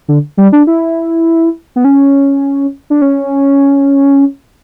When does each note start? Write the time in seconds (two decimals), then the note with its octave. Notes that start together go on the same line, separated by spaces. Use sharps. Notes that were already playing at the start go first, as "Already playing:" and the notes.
0.08 D3
0.37 G3
0.52 D4
0.67 E4
1.76 B3
1.85 C#4
2.90 D4
3.02 C#4